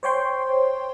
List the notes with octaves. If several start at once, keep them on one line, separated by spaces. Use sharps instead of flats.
C5 C#5 G5 C6